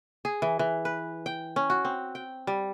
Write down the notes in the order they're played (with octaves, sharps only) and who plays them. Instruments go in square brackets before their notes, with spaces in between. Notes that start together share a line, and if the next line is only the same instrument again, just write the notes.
[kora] G#4
E3
E3
B4
G5
C#4
F#4
C4
G5
G3